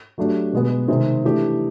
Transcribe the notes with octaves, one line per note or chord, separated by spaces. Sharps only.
F#3 A3 D4 G4
B2 G#3 B3
C3 D#3 G#3 C4
E3 A3 D4 G4